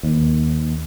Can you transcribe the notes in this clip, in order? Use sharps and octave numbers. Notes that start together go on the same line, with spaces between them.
D#2